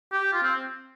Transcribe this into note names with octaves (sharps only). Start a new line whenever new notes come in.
G4
F4
C4